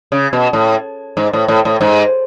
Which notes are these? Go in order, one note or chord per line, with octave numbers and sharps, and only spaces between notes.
C#3
B2
A2
G#2
A2
A2
A2
G#2